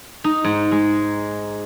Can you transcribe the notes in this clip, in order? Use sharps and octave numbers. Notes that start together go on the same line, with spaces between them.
D#4
G#2
G#3